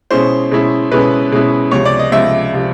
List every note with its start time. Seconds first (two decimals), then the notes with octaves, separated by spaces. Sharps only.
0.11 B2 G#3 C#4 E4 C5
0.51 B2 G#3 C#4 E4
0.91 B2 G#3 C#4 E4 B4
1.32 B2 G#3 C#4 E4
1.71 C#2 C3 F3 C#5
1.85 D5
1.99 D#5
2.12 C#2 C3 F3 E5
2.53 C3 F3